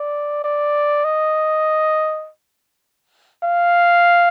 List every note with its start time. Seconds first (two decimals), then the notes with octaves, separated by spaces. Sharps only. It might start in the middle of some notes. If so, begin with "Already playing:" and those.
Already playing: D5
0.44 D5
1.05 D#5
3.44 F5